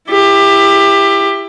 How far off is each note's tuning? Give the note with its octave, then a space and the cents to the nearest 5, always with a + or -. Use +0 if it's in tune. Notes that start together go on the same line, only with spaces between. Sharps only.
E4 +15 G4 +20